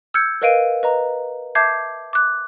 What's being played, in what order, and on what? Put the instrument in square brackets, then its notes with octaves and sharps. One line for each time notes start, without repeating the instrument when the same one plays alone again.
[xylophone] E6 F6 G6 G#6 C#7
A#4 B4 D#5 F5 D7 D#7
B4 D#5 A#5
E5 A5 D6 G6 G#6 C7
D6 F#6